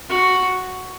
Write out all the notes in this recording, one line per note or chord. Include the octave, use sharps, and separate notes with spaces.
F#4